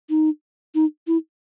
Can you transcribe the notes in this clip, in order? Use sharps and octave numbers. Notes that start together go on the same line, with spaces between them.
D#4
D#4
E4